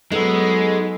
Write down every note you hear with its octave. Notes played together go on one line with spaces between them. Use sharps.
G#2 F#3 G#3 B3 D#4 A4 E6